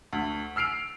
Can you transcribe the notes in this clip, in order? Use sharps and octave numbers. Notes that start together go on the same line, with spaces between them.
D2
E6 F6 C7 D7 F7